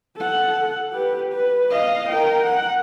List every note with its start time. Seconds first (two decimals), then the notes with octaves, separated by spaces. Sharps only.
0.16 A4 F#5
0.92 G4 B4
1.32 B4
1.70 D#5 F5
2.09 A#4 G5
2.43 F#5